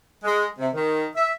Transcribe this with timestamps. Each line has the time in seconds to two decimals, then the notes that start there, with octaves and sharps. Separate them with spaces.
0.24 G#3
0.58 C3
0.73 D#3
1.15 E5